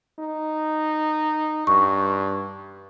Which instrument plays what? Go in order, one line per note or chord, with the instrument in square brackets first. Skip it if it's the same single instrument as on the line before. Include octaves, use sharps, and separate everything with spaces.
[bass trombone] D#4
[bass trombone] G2 [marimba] C#6